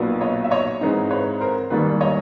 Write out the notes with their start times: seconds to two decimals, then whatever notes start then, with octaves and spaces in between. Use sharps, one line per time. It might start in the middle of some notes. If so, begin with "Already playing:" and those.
Already playing: B1 A#2 F#3 B3 D4
0.21 C#5 D#5
0.44 E5
0.51 C#5 D#5
0.81 G#2 E3 G#3 C4 D#4
1.10 B4 C#5
1.41 A#4 C5
1.70 E1 D#2 D#3 G3 B4
2.01 C#5 D#5